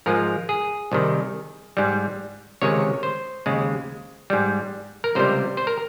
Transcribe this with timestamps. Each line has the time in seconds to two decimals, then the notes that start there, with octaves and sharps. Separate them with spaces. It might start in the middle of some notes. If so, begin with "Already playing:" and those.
0.06 G#2 F3 G#3 A#4
0.49 G#4
0.92 C2 C3 D#3
1.77 G#2 G3
2.62 C#2 C3 D#3 G#3 C#5
3.03 C5
3.46 D#2 C#3 G#3
4.30 G#2 G3
5.04 A#4
5.15 C#2 C3 G3 C5
5.57 C5
5.67 A#4